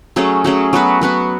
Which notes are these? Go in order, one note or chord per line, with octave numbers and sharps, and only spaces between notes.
F#3 A3 C#4 G#4
F#3 A3 C#4 G#4
F#3 B3 F#4 B4
F#3 B3 F#4 B4